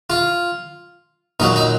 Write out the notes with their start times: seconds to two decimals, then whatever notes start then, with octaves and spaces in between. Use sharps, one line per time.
0.10 F4
1.40 A#2 F#3 D#4
1.56 D#4